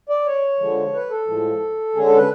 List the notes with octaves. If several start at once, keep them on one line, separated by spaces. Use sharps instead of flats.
D5
C#5
D3 F3 G#3
B4
A4
A2 F3 G#3
D3 G#3 C#4 G#4
A4
B4